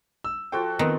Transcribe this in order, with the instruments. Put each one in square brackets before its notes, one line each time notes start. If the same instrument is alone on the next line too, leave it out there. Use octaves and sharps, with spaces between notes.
[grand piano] E6
[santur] F3 F#4 C5 [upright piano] A4 G5
[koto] D#3 [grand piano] B3 C4